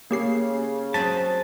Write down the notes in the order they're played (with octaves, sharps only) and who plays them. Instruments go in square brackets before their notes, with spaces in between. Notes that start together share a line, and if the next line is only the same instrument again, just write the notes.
[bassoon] C#3 [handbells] A#3 G4 C7
[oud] F#3 C4 G#4 [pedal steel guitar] A5 [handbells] B6